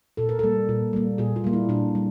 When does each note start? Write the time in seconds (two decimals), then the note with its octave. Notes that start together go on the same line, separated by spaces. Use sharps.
0.17 A#2 A4
0.29 A#4
0.39 G3 A#3 A4
0.69 A#2
0.93 G3 A#3
1.18 A#2 G#4
1.36 F4
1.44 G3 A#3
1.53 E4
1.69 A#2 D4
1.95 G3